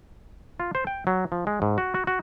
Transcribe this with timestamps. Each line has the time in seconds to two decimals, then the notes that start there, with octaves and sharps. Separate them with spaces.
0.60 F4
0.75 C5
0.87 G5
1.07 F#3
1.32 F3
1.47 G#3
1.62 G#2
1.78 F#4
1.94 F#4
2.07 F#4